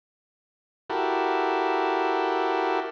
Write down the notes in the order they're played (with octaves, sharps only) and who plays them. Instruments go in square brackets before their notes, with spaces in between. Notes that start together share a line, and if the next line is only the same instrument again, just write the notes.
[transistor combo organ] E4 F#4 G4 A4 A#4